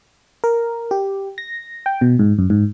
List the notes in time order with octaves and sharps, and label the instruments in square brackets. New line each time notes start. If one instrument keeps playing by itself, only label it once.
[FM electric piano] A#4
G4
A#6
G5
B2
G#2
F#2
G#2